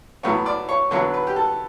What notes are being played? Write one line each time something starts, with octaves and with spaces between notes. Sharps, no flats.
A2 F#3 B3 C#5
D5
C#5
D3 F#3 B3 C#5
B4
G4
A4